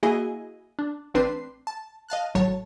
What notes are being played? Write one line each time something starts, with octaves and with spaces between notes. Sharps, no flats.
A#3 E4 F#4 G#4 D#5 G#5
D4
A1 C4 D4 B4 C6 C7
A5
D#5 F5 A5 F#6
G#1 A2 F#3 C#5 A5